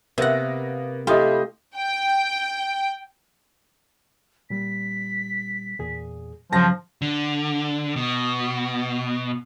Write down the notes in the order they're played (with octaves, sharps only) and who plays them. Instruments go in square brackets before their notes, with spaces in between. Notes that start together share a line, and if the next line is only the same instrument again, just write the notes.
[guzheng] C3 F#5 [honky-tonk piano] A#3 B3 A#6
[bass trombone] A3 [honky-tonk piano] E4 [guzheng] F4 [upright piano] G4 D#5
[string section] G5
[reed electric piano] A#2 G3 [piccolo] B6
[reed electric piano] E2 A#2 G#4
[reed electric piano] G2 C#3 F#3 [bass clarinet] F3 [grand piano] A5 A#6
[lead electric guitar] D3
B2